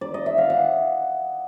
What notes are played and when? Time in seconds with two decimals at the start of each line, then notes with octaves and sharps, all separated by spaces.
0.01 D5
0.14 D#5
0.26 E5
0.38 F5
0.50 F#5